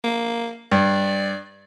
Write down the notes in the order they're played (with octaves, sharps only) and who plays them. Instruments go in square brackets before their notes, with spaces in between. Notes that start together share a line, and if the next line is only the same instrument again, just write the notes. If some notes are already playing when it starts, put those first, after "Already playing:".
[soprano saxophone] A#3
[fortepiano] G2 [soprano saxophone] D5